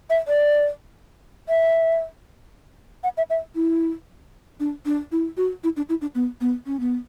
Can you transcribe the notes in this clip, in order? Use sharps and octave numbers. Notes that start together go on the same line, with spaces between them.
E5
D5
E5
F#5
E5
E5
E4
D4
D4
E4
F#4
E4
D4
E4
D4
B3
B3
C#4
B3